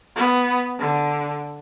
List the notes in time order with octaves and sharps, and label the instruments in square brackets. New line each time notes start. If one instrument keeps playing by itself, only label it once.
[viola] B3
D3